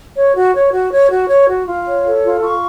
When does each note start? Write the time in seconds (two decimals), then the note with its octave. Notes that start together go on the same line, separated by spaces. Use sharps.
0.16 C#5
0.35 F#4
0.54 C#5
0.73 F#4
0.92 C#5
1.10 F#4
1.29 C#5
1.48 F#4
1.67 F4
1.86 C#5
2.05 A4
2.24 F4
2.42 F4 C#6